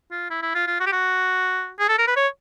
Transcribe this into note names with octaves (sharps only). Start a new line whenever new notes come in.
F4
E4
E4
F4
F4
F#4
G4
F#4
G#4
A4
A#4
B4
C#5